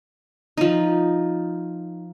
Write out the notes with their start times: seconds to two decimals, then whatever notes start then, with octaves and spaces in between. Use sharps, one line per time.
0.57 F3 D#4